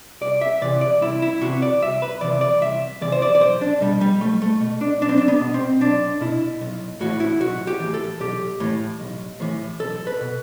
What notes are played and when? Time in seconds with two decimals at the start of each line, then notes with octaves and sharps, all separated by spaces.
0.21 C2 D5
0.41 E5
0.62 C3 E3 D5
0.81 D5
1.01 C2 E4
1.22 E4
1.41 C3 E3 F#4
1.62 D5
1.82 C2 E5
2.02 B4
2.21 C3 E3 D5
2.41 D5
2.61 C2 E5
3.01 C3 E3 D5
3.12 C5
3.22 D5
3.35 D5
3.40 B1 C5
3.61 D4
3.81 B2 G3
4.01 G3
4.21 B1 A3
4.42 A3
4.60 B2
4.81 D4
5.01 B1 D4
5.09 C4
5.18 D4
5.28 B3
5.41 B2
5.54 C4
5.81 B1 D4
6.21 B2 E4
6.61 B1
7.01 A2 E3 F#4
7.20 E4
7.41 B1 F#4
7.67 G4
7.80 A2 E3
7.94 A4
8.20 B1 G4
8.60 A2 E3
9.00 B1
9.40 A2 E3
9.79 B1 A4
10.07 B4
10.21 B2